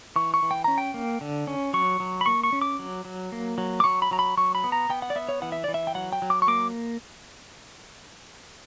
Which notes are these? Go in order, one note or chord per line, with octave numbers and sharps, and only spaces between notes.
E3 C#6
C#6
E3
G5
C#4 A#5
G5
A#3
D3
C#4
F#3 C#6
F#3
B5
A#3 C#6
C#6
C#4
D6
F#3
F#3
A#3
F#3
D6
F#3 C#6
B5
F#3 A#5
B5
F#3 C#6
B5
B3
A#5
B3 G5
F#5
D5
B3 E5
C#5
E3 F#5
E5
E3 D5
E5
G5
F#3 F#5
G5
F#3
D6
C#6
A#3 D6